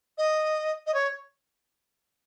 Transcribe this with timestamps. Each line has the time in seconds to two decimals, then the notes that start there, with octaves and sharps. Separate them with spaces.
0.18 D#5
0.87 D#5
0.94 C#5